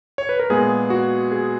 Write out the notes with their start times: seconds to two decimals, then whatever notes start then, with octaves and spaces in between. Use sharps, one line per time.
0.18 C#5
0.29 B4
0.39 A#4
0.50 A#2 G#3 B3 G#4
0.90 F#4
1.31 G#4